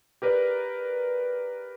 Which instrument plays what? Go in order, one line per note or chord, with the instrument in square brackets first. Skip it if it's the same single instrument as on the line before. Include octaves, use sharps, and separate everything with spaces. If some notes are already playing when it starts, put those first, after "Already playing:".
[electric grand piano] G4 A#4 B4 D5